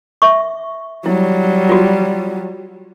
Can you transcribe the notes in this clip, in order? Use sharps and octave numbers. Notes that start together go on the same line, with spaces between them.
E5 C#6
F#3 G3 E4
F4 F#4